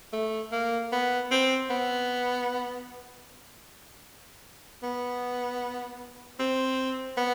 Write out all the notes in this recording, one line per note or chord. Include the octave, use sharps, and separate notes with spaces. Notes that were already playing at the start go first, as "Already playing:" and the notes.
A3
A#3
B3
C4
B3
B3
C4
B3